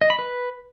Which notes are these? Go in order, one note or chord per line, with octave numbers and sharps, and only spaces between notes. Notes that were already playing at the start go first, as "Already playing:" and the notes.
D#5
B5
B4